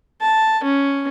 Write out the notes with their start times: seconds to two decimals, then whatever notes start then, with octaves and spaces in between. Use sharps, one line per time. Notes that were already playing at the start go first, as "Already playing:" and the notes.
0.21 A5
0.64 C#4